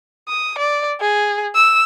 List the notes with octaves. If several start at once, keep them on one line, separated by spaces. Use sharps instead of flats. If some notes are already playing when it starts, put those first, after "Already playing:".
D#6
D5
G#4
E6